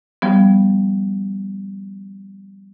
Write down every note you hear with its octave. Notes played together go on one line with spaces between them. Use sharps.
F3 G3 B3